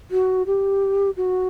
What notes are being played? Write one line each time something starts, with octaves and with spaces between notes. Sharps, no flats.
F#4
G4
F#4